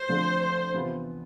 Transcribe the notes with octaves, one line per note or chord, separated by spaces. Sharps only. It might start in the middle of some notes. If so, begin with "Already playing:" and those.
Already playing: C5
D3 F3 A3 C4
E2 C3 E3 B3 F4